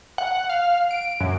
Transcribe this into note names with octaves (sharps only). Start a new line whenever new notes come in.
F#5
F5
D7
F#2